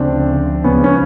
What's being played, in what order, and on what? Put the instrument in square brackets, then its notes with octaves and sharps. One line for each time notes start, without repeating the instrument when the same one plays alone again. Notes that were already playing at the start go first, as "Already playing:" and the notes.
Already playing: [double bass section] D2 C#3 F3 [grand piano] C4 D4
[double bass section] C#2 C#3 F3 [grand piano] B3 C#4
[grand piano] C#4